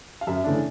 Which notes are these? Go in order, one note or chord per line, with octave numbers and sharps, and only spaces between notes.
F5
F#2 E5
C#3 E3 A3 D4